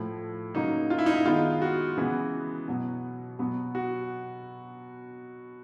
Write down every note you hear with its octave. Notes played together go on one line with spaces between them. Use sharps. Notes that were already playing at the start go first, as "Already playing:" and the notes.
Already playing: A2 F3 A3
C#3 F#3 A#3 D#4
F4
E4
D#4
E4
D#3 G#3 B3 F4
F#4
C#3 E3 G#3 B3
B2 F#3 B3
B2 F#3 B3
F#4